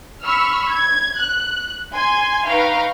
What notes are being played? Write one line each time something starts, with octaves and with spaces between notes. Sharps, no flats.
B5 C#6 E6 F6
G#6
F#6
G#5 C6 G#6
D#4 B4 F5 G5 A#5 C#6